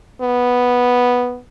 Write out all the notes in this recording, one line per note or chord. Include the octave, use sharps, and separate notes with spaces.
B3